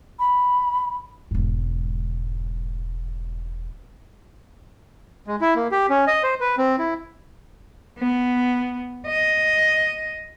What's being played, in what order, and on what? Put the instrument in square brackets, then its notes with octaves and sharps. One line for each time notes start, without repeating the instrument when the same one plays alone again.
[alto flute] B5
[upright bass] E1 G#2
[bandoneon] G#3
E4
A#3
G4
C#4
D#5
C5
B4
C4
E4
[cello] B3
D#5